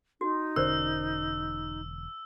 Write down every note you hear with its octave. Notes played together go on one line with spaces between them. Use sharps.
D#4 F#4
E1 D3 C#4 A#4 C5 D5 E6